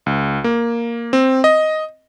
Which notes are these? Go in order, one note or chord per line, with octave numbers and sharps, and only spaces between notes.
C#2
A#3
C4
D#5